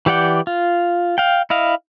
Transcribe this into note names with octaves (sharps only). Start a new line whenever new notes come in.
E3 G4 D5 F#5 G5
F4
F5 G5
E4 D#5 F5